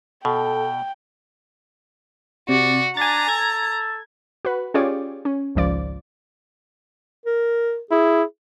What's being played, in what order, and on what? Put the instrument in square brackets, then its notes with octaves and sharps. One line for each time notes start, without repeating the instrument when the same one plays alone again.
[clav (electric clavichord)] B2 [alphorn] A4 [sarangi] G5
[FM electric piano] C3 [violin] F#4 [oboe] D5
[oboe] D4 [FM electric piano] G#5 A6 [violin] A#5
[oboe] A4 [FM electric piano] G#6
[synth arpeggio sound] F#4 B4
C#4 F4 G4 G#4 C#5 D5
C#4
G#1 C#2 F3 D5
[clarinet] A#4
[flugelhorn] E4 [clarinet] G#4